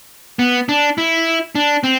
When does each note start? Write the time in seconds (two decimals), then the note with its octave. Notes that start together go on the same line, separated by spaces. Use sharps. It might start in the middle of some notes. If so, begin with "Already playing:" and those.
0.39 B3
0.69 D4
0.98 E4
1.55 D4
1.84 C4